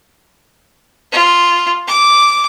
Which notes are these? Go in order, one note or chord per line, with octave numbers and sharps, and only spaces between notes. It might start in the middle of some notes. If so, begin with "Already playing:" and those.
F4
D6